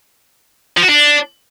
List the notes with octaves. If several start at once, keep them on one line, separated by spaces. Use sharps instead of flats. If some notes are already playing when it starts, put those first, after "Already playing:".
F3
F#4
D4